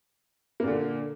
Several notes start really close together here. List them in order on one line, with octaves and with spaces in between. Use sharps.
A#3 A#2 D3